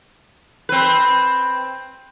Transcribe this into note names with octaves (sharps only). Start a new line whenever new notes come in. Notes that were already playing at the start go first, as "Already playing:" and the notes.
C4 B4